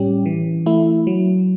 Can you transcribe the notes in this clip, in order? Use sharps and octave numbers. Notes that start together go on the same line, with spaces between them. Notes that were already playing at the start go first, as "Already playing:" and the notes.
Already playing: A2 G3 C#4 G4
E3
A3 E4
F#3